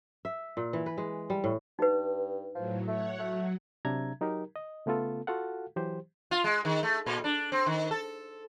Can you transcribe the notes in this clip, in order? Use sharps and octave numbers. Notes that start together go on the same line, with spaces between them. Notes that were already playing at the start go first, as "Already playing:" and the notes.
E5
A#2
E3
B4
G#3
G3
A2
G2 D#4 B4
A2 F3 F#3
A3 C#5 F#5
F#3 A3
C3 F#3 D4 E5 A#5 G#6
F#3 D#4 G4 A#4
D#5
C#3 A3 B3 F4 A4
F4 F#4 A4 F5 F#5
E3 F#3 G4 C5
F4
G#3
D#3
A3
A#2
D4
C4
D#3
A4